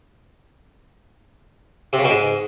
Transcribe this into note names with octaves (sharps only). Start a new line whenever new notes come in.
C3
C#3
B2
G#2